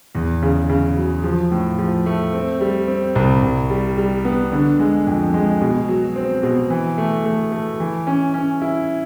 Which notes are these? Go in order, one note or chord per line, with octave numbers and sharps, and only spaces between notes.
E2
C#3
C#3
F#3
F3
A2
F3
A3
C4
G3
C4
C2
C2
G3
G3
B3
D3
G#3
F2
G#3
B2
F#3
C4
B2
E3
A3
A3
A3
E3
C#4
C#4
E4